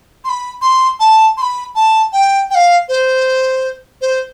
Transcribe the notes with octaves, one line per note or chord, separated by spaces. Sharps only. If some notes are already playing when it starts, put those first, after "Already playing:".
C6
B5
C6
A5
C6
B5
A5
G5
G5
F5
C5
C5